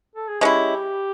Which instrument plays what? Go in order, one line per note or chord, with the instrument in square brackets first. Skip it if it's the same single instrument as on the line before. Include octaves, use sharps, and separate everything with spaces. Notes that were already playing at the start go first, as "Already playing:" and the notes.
[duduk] A4
G#4
[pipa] G#3 C#4 E4 [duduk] G4